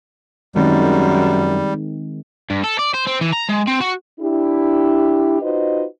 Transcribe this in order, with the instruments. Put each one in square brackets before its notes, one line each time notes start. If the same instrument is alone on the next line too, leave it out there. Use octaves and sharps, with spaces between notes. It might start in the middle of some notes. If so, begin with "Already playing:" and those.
[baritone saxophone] F#2 [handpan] D#3 G#3 C4 [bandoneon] G3
[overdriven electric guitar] G2
A4
D5
C5
C4
E3
A#5
G#3
C4
F#4
[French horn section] D4 E4 G4
D#4 F4 F#4 B4 C5 D#5